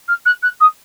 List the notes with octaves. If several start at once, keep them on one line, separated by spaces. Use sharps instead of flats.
F6
F#6
F#6
D#6